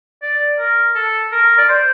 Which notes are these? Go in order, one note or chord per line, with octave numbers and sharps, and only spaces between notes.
D5
A#4
A4
A#4
D5
C5